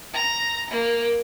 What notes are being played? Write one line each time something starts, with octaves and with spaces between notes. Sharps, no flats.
A#5 A#6
A#3